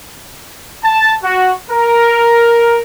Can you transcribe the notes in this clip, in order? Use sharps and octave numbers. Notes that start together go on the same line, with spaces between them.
A5
F#4
A#4